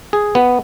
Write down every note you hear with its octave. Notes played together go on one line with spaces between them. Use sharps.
G#4
B3